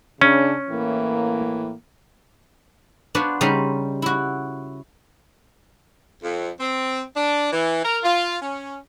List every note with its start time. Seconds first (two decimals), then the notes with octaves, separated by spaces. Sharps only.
0.21 C#3 C#4 D4
0.69 A2 E3 A#3
3.15 B3 D4 F4 F#4 C5
3.41 C#3 G3 D#4 C5 C6
4.02 E4 F#4
6.23 F2
6.60 C4
7.16 D4
7.52 E3
7.84 A#4
8.04 F4
8.42 C#4